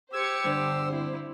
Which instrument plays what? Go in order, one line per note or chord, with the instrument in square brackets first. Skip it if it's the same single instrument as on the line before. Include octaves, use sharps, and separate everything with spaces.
[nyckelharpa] G4 [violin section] C5 G#6 C#7 [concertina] E6
[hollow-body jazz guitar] G2 D3 [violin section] C5
[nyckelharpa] C4 E4